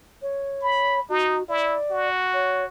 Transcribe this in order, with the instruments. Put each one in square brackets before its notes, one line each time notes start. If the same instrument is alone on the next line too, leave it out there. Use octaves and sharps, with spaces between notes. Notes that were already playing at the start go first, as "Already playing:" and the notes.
[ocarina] C#5
[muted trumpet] B5
[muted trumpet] D#4 [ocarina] F#4
[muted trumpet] E4 [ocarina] D5
[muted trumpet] F#4
[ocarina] C#5